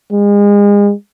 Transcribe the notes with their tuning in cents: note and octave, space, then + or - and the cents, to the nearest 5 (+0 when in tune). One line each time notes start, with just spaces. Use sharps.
G#3 -35